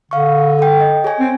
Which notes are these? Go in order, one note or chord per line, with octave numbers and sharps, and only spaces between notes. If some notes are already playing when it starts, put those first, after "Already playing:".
D3 F5 C#6
A4 G5
D#5
G#4 C#5 G#5
C4